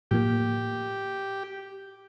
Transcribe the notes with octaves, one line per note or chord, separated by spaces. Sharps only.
A2 F3 A#3 G4